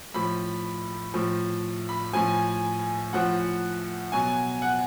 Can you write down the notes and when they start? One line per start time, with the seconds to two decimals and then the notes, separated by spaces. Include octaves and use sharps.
0.14 A2 F3 B5
1.14 A2 F3
1.89 B5
2.13 A2 F3 G#5
3.13 A2 F3 F#5
4.12 B2 F#3 G#5
4.62 F#5